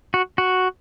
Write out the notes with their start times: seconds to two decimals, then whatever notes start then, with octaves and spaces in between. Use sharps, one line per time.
0.14 F#4
0.38 F#4